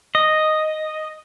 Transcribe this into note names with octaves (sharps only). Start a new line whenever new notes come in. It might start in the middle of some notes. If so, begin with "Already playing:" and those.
D#5